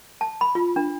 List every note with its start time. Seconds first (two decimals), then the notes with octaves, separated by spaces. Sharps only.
0.21 A5
0.41 B5
0.55 F4
0.76 D4